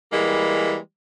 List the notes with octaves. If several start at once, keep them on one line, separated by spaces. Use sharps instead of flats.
E3 G3 G#3 A#3